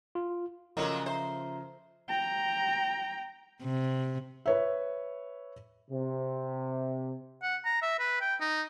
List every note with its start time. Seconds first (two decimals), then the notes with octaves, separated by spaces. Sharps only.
0.15 F4
0.77 A#2 C#3 F3 F#3 A3 F4 A#4 D#5
1.06 C5 E5 A#5
2.09 G5 A#5
3.63 C3
4.46 B4 C#5 E5
5.90 C3
7.42 F#5
7.65 A#5
7.82 E5
7.99 B4
8.21 G5
8.41 D#4